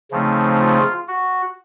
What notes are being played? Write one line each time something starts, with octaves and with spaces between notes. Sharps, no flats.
C#3 F3 A3 C4 D#4
F4
F#4